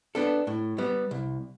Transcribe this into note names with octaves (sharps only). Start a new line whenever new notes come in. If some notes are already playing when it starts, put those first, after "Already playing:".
B3 D4 A4
A2
G3 B3
C2